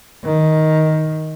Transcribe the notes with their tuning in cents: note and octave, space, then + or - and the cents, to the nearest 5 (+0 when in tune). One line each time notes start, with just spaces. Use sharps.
D#3 +10